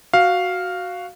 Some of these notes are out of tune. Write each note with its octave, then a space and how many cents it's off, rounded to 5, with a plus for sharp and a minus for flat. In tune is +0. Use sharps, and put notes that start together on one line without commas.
F#4 +0 F5 +0